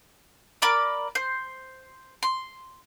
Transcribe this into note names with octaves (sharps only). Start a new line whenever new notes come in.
A#4 D5 B5 D6
C5
C6